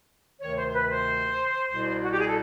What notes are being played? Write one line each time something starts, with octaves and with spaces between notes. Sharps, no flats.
D2 C3 D#3 C#5
C5
C5
B4
C5
C2 B2
F#4
G4
G#4
A4